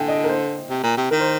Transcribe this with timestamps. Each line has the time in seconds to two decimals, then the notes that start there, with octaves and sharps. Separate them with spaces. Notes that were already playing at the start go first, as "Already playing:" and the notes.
Already playing: D3 G5 G#5
0.08 D#5
0.24 A#4
0.29 C5
0.70 C3
0.83 A#2
0.97 C3
1.11 D#3 A#4
1.20 C5